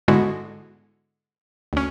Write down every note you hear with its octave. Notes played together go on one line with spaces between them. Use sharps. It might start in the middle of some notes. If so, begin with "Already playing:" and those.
G#2 D3 G#3 B3 E4 F#4
D2 C#4